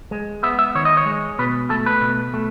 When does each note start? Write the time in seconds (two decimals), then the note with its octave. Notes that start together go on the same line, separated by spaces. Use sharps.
0.11 G#3
0.43 B3 E5
0.59 E5
0.75 D#3 C#5
0.85 D#5
0.97 C#5
1.06 G#3
1.39 B2 B4
1.70 A3 A4
1.86 B4
2.01 B2
2.34 A3